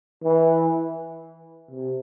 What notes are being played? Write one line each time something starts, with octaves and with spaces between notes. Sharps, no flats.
E3
C3